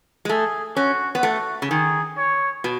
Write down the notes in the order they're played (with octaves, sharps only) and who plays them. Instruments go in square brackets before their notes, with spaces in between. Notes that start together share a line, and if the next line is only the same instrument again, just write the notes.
[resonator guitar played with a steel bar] G#3
[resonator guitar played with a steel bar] A3 [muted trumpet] G#4
[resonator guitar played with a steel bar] C#4 [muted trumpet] F#4
[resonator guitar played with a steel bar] B3
[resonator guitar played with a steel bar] A3 [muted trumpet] F#4
[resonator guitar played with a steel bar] C#3
[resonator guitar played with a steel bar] D#3 [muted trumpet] G#4
[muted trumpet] C#5
[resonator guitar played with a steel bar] B2